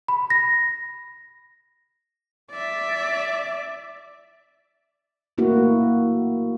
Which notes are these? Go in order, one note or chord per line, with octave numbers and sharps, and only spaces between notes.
B5
A#6
D5 E5
A3 A#3 E4 F#4